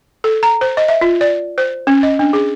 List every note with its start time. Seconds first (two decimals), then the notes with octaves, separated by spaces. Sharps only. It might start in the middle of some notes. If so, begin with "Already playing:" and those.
0.24 A4
0.43 A#5
0.61 C5
0.77 D#5
0.88 E5
1.01 F4
1.21 D5
1.58 C5
1.87 C#4
2.03 D#5
2.19 D4
2.33 G#4